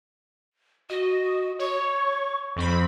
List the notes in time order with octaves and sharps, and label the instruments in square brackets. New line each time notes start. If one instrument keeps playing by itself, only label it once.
[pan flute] F#4 [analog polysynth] D#5
[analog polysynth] C#5 [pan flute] C#6
[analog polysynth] F2 C4 B5